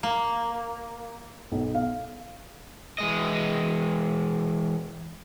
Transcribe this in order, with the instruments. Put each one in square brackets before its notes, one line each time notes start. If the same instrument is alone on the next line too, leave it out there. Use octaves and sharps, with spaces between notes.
[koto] A#3
[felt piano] B1
F5
[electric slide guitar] E3 G#3 D#5